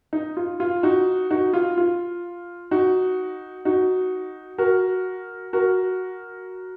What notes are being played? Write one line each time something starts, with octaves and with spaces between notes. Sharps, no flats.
D#4
F4
F4
D#4 F#4
D#4 F#4
F4
F4
D#4 F#4
D#4 F#4
F#4 A#4
F#4 A#4